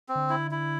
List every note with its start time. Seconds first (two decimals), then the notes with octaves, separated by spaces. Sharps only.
0.09 C4
0.15 D3
0.29 E4
0.51 E4